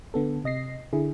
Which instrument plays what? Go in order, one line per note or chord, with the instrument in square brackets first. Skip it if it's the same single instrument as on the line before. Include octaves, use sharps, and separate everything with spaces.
[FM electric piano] D3 B3 A4
C3 D#5 A#6 C7
D3 E4 G#4